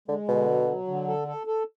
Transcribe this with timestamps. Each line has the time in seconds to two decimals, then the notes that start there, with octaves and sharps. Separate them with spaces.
0.08 D3 G#3
0.28 B2 D3
0.48 F#3
0.68 F#3
0.88 D3
1.07 A4
1.28 A4
1.47 A4